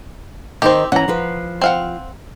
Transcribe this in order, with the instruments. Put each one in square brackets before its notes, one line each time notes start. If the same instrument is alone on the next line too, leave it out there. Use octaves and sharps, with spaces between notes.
[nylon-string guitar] D#3 D#4 C5 [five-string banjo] C4 G4
[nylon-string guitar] E3 C#4 [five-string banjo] F#5 A#5
[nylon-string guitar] F3 F4 B4
[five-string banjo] C4 F5 F#5